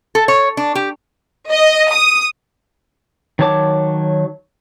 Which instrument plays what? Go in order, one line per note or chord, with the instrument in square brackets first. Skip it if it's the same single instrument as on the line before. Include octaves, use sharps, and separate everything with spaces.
[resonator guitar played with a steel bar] A4
C#5
D4
G4
[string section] D#5
D#6
[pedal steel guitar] D#3 F#3 C#5 A5 D6